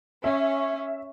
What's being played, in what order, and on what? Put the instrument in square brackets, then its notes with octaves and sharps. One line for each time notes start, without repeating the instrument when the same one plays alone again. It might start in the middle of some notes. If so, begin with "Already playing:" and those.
[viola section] C#4 [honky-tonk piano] E5